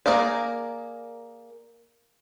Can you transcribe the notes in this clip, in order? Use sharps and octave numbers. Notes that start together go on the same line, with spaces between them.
A#3 G#4 A#4 D5